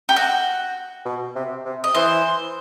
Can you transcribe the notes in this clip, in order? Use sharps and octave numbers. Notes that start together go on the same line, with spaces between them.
G4
F#4
B2
C3
C3
D#5
E3 C5